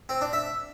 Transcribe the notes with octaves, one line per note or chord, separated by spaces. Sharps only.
C4
D4
E5